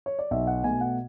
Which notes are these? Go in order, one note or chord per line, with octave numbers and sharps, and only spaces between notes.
C#5
D5
B1 E5
F#5
B2 A3 G#5
F#5